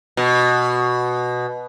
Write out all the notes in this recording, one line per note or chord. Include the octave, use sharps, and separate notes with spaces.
B2